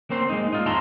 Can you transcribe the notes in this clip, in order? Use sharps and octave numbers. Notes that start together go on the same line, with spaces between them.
A#3 C4 C5
G#3 D#4
D#4 F4
D#2 E5 A5 A#5 C6